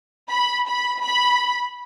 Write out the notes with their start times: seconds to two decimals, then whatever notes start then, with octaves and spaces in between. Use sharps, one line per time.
0.31 B5
0.68 B5
1.03 B5